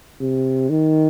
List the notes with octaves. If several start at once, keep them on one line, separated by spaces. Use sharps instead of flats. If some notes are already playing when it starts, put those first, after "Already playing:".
C3
D#3